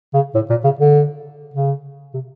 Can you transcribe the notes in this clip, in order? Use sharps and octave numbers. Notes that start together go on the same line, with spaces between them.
C#3
A2
A#2
C#3
D3
C#3
C3